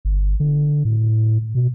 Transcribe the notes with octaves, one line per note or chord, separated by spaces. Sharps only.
G1
D3
A2
B2